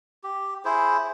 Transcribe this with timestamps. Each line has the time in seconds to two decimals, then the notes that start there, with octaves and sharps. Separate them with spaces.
0.24 G4
0.65 E4 G#4 C5